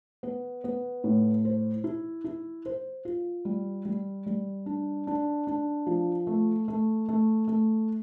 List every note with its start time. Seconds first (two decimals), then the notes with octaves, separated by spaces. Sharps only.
0.23 B3
0.64 B3
1.04 A2
1.45 C5
1.84 E4
2.24 E4
2.66 C5
3.05 F4
3.45 G3
3.85 G3
4.26 G3
4.66 D4
5.07 D4
5.47 D4
5.87 F3
6.27 A3
6.68 A3
7.09 A3
7.48 A3